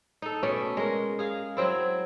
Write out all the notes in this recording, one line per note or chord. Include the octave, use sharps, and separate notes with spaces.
D#4 A4
B2 A3 C#4 D5
G#3 A#4
G#4 F5
F#3 C4 E4